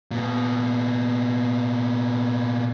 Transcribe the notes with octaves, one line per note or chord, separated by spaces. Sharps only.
A#2 B3